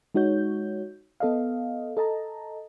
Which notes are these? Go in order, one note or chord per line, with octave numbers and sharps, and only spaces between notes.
G#3 D#4 F#4 C#5 G6
B3 A4 D#5 F5
A4 D#5 A5 A#5